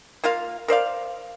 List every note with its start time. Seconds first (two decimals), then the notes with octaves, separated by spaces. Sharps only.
0.24 A#3 F4 A#4 F5
0.68 A#4 C5 D5 F5